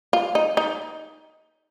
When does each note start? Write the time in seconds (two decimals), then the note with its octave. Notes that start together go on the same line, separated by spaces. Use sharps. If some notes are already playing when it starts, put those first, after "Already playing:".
0.13 F4
0.35 D#4
0.57 D#4